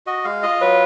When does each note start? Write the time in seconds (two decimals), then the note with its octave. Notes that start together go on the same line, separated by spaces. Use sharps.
0.07 F#4 D#5
0.24 G#3 F5
0.43 F4 D#5
0.61 F#3 B4